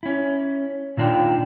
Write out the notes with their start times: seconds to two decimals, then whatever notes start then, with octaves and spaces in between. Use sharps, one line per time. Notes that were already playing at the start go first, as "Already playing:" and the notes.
0.03 C#4 E4
0.97 A#2 D#3 D4 F4 G5